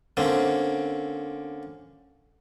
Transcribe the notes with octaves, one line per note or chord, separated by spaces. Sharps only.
D3 A#3 C4 C#4